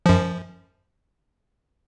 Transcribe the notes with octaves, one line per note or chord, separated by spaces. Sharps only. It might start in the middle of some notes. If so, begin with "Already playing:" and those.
F#2 F3